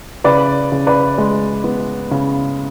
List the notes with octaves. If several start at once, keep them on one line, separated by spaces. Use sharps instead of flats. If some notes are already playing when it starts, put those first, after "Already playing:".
C#3 B4 D5
C#3
B4 D5
G#3
B3
C#3